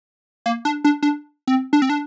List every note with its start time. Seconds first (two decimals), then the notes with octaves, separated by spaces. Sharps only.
0.46 A#3
0.65 D4
0.84 D4
1.03 D4
1.47 C4
1.73 D4
1.82 C4
1.90 D4